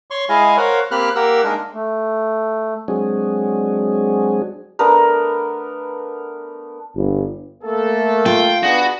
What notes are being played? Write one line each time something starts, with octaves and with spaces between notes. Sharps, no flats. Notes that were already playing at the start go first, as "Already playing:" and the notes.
C#5 C6 C#6
G#3 E4 G#4 D#5 F5 G#5
A#4 C5 C#5 F5 F#5
A#3 C4 G4 B5 F6 F#6
A#3 G4 A#4 F#5 E6
G#3 A#3 D4 D#4 A#4
A3
F#3 G#3 C4 D4 F#4 G#4
A3 B3 D4 A#4
G1
A3 A#3 A4
F4 G5
B3 D4 F#4 G#4